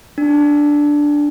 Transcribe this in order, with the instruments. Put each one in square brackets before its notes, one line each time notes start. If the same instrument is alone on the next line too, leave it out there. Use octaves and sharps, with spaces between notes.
[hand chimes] D4